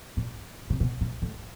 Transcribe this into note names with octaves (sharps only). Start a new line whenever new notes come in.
A#2
C3
B2
A#2
A2